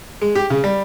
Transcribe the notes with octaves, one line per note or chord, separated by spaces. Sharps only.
G#3
G4
C#3
G3